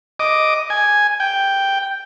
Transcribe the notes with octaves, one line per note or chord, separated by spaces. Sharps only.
D#5 D6
G#5
G5